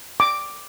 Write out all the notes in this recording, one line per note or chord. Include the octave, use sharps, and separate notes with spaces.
D6